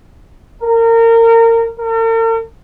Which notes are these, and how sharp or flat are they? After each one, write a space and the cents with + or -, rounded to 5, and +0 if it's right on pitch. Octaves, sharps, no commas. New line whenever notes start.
A#4 -25
A#4 -45